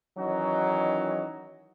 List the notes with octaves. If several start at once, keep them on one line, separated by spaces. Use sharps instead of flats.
D#3 E3 F#3 C#4 D#4 F#4